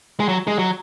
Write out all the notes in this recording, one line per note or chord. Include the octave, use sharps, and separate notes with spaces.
G#3
F#3
G#3
F#3